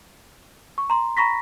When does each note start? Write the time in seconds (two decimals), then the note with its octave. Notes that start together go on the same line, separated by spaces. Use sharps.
0.78 C#6
0.90 A#5 C6
1.17 A#5 B5 C#6 A#6 B6